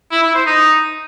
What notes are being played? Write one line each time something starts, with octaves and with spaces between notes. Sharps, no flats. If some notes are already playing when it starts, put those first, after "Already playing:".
E4
E4
C5
D#4